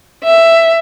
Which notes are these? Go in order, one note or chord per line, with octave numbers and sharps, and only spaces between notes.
E5